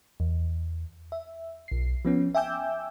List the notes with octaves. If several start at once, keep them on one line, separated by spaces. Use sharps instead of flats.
E2
E5
B1 C7
F3 B3 C#4
E5 G5 G#5 D6 E6 G6